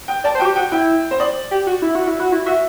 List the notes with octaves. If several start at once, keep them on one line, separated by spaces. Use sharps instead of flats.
G5
D5 A5
C5
F#4 G5
G4
F#4 G5
E4 G5
C5
D5
G4
F#4
E4
F#4
E4
F#4
E4
F#4 E5